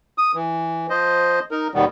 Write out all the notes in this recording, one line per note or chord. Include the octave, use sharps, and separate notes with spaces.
D#6
E3
F3 C5 D#5
D#4 A#4
D#2 B2 D#3 G3 B3